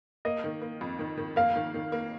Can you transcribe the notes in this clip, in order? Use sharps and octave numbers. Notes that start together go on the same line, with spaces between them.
A#3 D#5
D#3
A#3
F2
D#3
D#3
A#3 F5
D#3
D#3
A#3